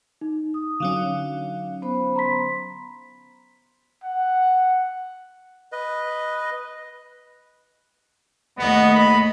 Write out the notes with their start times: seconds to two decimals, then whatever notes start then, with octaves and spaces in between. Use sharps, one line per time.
0.21 D#4
0.54 D#6
0.80 D3 F#3 C#4 F5
1.82 B3 C5 B5
2.16 A#5 C6 B6
4.04 F#5
5.72 B4 D#5
8.58 D#2 A3 B3 D#5
8.95 B5